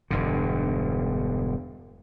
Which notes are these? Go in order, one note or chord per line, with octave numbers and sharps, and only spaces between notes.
E1 G2 D3